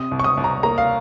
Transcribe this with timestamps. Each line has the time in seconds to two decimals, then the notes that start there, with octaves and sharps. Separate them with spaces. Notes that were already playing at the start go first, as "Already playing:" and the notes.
Already playing: C3 D#6
0.11 C2
0.20 C#6
0.24 D#6
0.37 C2
0.44 A#5
0.63 A#3 A#5
0.78 F5